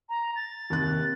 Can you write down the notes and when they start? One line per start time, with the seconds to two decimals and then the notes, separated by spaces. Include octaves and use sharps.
0.09 A#5
0.36 A6
0.70 D#2 C3 F#6